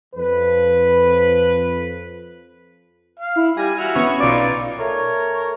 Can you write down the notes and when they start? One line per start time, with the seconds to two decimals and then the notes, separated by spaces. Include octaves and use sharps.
0.15 F2 F3 B4
3.19 F5
3.36 E4
3.57 G3 G#5 A#6
3.79 F#4 E5 F6
3.95 B3 C#4 C#6
4.20 B1 D#4 F4 D5 D6
4.78 A3 A#4 C#5